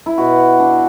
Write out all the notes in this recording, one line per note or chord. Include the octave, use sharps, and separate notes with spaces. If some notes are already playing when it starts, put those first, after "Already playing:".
E4
B2 F#4
D4